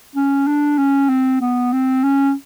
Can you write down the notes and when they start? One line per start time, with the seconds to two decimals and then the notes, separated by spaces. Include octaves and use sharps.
0.16 C#4
0.47 D4
0.79 C#4
1.09 C4
1.41 B3
1.73 C4
2.04 C#4